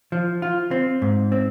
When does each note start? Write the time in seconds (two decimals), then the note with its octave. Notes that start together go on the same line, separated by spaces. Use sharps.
0.12 F3
0.42 F4
0.71 C4
1.02 G#2
1.32 C4